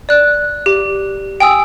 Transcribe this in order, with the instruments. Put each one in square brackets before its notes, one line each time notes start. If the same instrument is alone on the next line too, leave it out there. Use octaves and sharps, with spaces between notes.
[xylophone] D5 F#6
G4
G5 G#5 D#6 E6